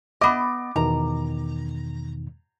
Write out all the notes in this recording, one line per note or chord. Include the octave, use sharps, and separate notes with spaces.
B3 D#5 D6
E2 B2 D#3 A#5